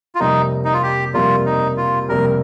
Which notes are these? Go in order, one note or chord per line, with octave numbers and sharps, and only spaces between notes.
F4
F2 C3 G3 A#3 D#4
D#4
F4
G4
F2 C3 G3 A#3 F4
D#4
F4
F2 C3 G3 A#3 A#4